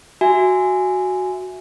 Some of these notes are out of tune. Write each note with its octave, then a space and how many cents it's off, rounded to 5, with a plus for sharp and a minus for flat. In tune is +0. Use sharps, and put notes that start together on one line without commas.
F#4 +0 E5 +0 G#5 +0